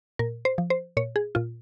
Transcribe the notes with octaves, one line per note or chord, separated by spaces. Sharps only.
A#2 A#4
C5
F3
C5
A#2 C#5
G#4
A#2 F4